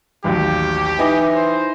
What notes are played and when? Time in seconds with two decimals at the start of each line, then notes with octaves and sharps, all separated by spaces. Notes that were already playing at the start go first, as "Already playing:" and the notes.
0.24 A1 D#2 F#3 G4
0.99 E3 D#4 D#5 G#5
1.35 C5